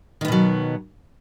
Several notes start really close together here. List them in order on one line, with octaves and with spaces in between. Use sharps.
D#3 B3 B2 F#3